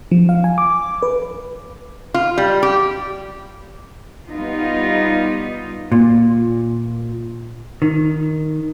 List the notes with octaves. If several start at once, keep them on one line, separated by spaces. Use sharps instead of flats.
F3
F5
G#5
D6
B4
F4
G3
G4
G3 B3 D#4 F4
A#2
D#3